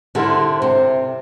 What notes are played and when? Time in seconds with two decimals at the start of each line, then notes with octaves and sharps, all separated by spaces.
0.15 D3 G3 C4 E4 A#4
0.62 C3